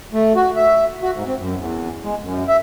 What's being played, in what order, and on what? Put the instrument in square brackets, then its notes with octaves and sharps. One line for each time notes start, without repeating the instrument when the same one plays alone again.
[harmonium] A3
F#4
E5
F#4
G#2
C4
F#2
E2
G#3
F#2
E5